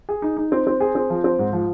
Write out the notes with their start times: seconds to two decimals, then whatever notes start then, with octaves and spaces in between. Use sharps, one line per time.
0.09 G#4
0.22 D#4
0.37 D#4
0.52 C4
0.67 C4
0.80 G#4
0.95 C4
1.10 F3
1.24 C4
1.39 G#2
1.53 F3